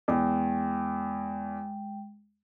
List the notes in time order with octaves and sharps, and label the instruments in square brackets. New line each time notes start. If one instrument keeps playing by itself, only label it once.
[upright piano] E2 [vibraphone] G#3 G5